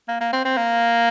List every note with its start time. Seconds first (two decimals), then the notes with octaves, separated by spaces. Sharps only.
0.08 A#3
0.21 A#3
0.33 C4
0.45 C4
0.57 A#3